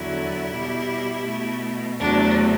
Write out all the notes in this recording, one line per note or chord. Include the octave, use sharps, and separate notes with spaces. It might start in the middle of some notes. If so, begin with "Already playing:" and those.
Already playing: E2 D3 F#3 E4
B2 G3
B2 A3
E2 C3 F#3 A3 D4